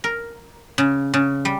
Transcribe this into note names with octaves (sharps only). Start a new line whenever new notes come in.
A#4
C#3
C#3
G3